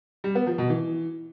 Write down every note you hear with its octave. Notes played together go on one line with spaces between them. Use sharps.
G3
B3
F3
B2
E3